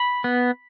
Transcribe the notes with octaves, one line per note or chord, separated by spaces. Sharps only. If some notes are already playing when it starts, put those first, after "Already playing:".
Already playing: B5
B3